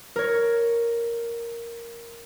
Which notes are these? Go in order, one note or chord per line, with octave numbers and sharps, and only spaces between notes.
A#4 C#5